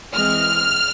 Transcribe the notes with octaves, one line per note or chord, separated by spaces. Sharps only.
E3 G#3 C4 F6